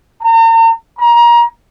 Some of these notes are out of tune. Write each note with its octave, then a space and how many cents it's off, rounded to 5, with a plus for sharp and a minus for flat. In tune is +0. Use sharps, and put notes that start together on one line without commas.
A#5 -45
A#5 +25